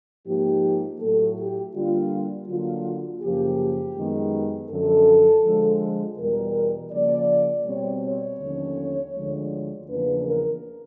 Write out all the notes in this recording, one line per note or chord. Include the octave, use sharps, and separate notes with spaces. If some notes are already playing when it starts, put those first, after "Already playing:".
G#2 F3 A#3 D#4 G4
A2 F#3 A3 A4
G4
D3 G3 A#3 D4 F4
D3 F#3 A#3 F4
F#2 C#3 F3 A#3 G4
F#2 D#3 G#3 B3
F#2 D3 F3 A4
D3 F3 G#3
E2 B2 G3 A#4
C#3 F3 A#3 D5
B2 G3 C4 C#5
C#5
D#2 D3 F3 A3 C#4
D2 D3 F3 G#3
E2 C#3 F3 A#3 D4 B4
A#4